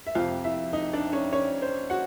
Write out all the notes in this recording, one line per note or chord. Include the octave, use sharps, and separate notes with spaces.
E5
F2 C3 F3 F4 F5
E4 E5
D#4 D#5
D4 D5
C#4 C#5
C#4 C#5
C5
F#4 F#5